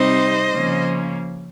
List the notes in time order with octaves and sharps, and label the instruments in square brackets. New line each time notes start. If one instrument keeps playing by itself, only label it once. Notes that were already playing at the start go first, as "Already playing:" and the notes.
Already playing: [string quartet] C3 G3 C4 D#4 C5 D#5
C#3 F3 A#3 C#4